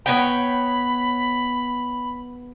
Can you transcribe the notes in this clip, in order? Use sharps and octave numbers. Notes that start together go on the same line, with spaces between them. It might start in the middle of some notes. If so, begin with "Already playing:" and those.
B3 C#5 G5 B5